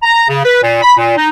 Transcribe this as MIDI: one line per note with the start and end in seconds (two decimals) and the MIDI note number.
0.03 0.27 82
0.28 0.43 49
0.43 0.60 71
0.62 0.81 46
0.82 0.93 83
0.97 1.15 46
1.17 1.28 63